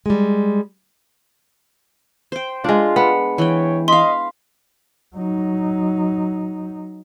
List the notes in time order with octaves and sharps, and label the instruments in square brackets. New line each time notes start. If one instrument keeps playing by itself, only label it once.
[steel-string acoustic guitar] G3 G#3
[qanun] C5 G5
[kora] G#3 D4 [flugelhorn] F4
[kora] B3
[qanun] E3 G5 [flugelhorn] C#5
[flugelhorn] D#5 [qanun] F5 B5 [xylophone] C6
[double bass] F#3 D#4